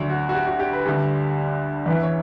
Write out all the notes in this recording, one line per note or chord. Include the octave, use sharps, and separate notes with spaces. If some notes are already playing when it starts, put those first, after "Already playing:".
Already playing: D2 D3 F#3
F#4
F#4
G4
F#4
G4
B4
D2 D3 G3
E2 C#3 E3 B4
C#5